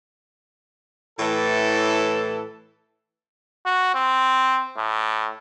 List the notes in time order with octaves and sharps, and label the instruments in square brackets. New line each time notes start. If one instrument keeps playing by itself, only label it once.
[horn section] A2 E3 A4
[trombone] F#4
C4
A2